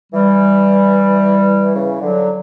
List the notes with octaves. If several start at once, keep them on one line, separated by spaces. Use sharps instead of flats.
E3 G3
C#3 E3
D3 F#3